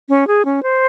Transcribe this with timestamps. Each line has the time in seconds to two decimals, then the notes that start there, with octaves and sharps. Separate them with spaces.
0.09 C#4
0.27 G#4
0.45 C#4
0.63 C5